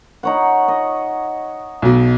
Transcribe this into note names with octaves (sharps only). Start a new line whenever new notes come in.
D#4 C#5 F#5
D#5
B1 B2